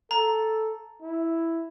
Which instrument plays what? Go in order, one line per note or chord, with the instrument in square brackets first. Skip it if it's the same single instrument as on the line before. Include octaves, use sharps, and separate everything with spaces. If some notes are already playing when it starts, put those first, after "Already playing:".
[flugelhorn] A4 [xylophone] A#5
[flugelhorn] E4